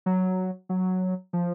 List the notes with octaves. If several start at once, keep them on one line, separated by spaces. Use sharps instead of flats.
F#3
F#3
F3